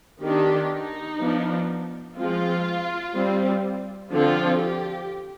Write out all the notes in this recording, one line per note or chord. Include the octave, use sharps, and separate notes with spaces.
D#3 B3 D4 G4
D#4
F3 B3 D4
F3 G#3 C4 F4
G3 C4
D3 F3 C4 F4
G4